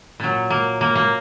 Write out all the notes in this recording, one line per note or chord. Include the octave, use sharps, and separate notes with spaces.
A#2 F#3
A#3
A#3
A#3